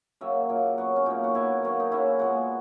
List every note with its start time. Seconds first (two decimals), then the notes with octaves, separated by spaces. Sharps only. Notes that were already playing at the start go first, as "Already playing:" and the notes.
0.21 C#3 F#3 A#3 E5
0.49 A#2 A#3
0.78 C#3 F#3 B3 F#4
0.96 C#4
1.06 A#2 F#3 A#3 D#4
1.24 F#4
1.34 B2 F#3 A#3 E4
1.63 D#3 F#3 A#3
1.80 D#4
1.91 C#3 F#3 A#3 E4
2.19 A#2 G#3 B3 F#4